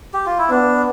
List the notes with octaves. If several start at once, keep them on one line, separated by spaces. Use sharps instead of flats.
G4
F4
E4
B3 D4